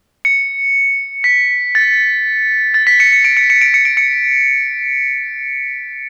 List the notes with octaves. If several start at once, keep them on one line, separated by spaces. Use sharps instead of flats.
C#7
B6
A6
A6
B6
C#7
C#7
D7
C#7
C#7
D7
C#7
D7
C#7